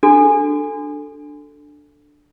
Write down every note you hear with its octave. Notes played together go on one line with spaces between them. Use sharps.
D4 F#4 A4